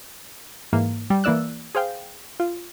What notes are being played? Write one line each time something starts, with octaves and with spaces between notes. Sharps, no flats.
G#2 E3 A#3
G3
E3 A#3 E4 D5 E6 F#6
G#4 C5 F5 G5
F4